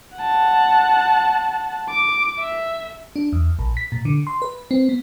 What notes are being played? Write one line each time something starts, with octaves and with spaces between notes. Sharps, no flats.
F#5 A5
D6
E5
D4
E2
A#1
B6
A#2
D3
C6
B4
C4
B3